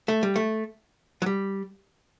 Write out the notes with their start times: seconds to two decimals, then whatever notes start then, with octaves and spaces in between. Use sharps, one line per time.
0.08 A3
0.23 G3
0.36 A3
1.22 F#3
1.26 G3